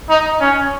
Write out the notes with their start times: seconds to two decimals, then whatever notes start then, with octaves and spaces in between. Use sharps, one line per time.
0.10 D#4
0.41 C#4